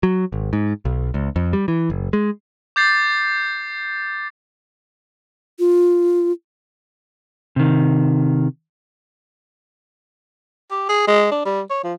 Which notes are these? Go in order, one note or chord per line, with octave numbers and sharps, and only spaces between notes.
F#3
G#1
G#2
B1
C#2
F2
G3
E3
F#1
G#3
D6 G6 A6 C7
F4
C3 D#3
G4
G#4
G#3
D4
G3
C#5
F3